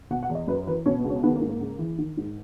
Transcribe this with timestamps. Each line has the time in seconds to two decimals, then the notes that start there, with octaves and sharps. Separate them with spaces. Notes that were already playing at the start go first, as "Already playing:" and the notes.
0.10 B2 F#5
0.23 F#5
0.29 E2
0.35 D#5
0.48 F#2 B4
0.67 E3 B4
0.86 B2 C#4
0.99 B3
1.04 C#2
1.10 C#4
1.23 D#3 B3
1.36 A#3
1.41 G#2
1.48 A#3
1.61 C#2
1.79 E3
1.98 D#3
2.17 G#2